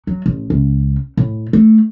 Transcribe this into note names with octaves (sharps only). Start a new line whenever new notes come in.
F#3
A1
C#2
A2
A3